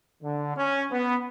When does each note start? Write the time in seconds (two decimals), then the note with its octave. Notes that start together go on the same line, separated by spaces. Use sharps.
0.22 D3
0.55 C#4
0.90 B3